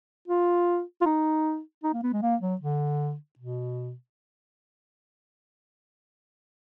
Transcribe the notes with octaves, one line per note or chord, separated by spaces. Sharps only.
F4
F4
D#4
D#4
A#3
B3
G#3
A#3
F#3
D3
B2